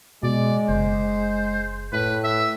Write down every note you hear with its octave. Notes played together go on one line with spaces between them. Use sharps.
B2 G#3 D5
F#1 C5
A2 B4
E5